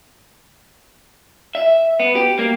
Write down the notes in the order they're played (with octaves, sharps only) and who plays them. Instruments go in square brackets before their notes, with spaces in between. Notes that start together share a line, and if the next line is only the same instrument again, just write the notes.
[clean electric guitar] E5
B3
G4
A#3